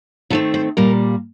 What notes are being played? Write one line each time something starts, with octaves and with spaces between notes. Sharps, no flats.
D#3 A3 C4 A4
C5
A#2 G3 A#3 A#4